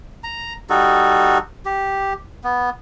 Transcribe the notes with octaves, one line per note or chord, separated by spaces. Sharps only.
A#5
G3 D#4 F#4 A4
G4
B3